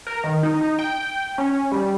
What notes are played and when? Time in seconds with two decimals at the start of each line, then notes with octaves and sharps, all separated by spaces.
0.07 A#4
0.24 D#3
0.43 D#4
0.61 D#4
0.79 G5
1.38 C#4
1.72 G3